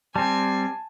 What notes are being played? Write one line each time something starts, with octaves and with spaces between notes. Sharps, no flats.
G3 C4 G#5 A5